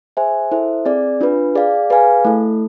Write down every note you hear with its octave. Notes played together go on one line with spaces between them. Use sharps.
G#4 C5 E5 G#5
E4 A4 C5 E5
C4 G#4 D5
D4 F4 B4
G#4 D5 F5
G#4 B4 F5 G#5
A3 E4 A4